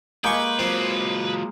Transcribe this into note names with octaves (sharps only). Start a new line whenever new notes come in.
G#3 A#3 G#4 B4 G5 C#6
F#3 C4 F4